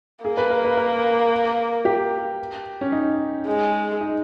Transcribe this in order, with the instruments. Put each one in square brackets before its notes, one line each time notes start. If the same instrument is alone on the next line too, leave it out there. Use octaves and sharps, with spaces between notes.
[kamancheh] A#3 [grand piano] G#4
[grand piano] B4
A#4
B4
A#4
G4
C#4
D#4
[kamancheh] G#3
[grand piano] D#4